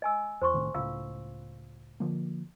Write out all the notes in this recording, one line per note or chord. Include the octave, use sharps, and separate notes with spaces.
D#5 G#5 E6
E2 C5 C6 C#6
C2 A2 D#3
C#2 A2 F4 F5 E6
D3 F3 A#3